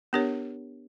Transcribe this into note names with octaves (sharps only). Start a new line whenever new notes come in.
B3 D4 G4 A#4 C#5